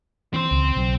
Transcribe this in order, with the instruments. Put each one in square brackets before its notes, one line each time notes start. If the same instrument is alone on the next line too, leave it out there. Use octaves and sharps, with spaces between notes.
[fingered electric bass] E3 [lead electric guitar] C4 C5
[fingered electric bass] C#2
B1 F#3